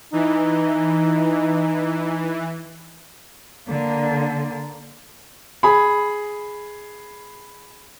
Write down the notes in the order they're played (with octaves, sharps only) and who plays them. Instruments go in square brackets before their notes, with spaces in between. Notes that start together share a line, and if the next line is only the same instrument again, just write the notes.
[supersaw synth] E3 [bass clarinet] D#4
[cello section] D3 [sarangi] A#3
[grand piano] G#4 B5